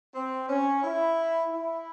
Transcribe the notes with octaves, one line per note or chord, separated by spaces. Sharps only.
C4
C#4
E4
E4